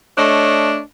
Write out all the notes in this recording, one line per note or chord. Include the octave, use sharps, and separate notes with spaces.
A3 D4 C#5 D#5